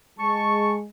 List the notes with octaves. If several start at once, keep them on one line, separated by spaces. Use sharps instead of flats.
G#3 A5 C#6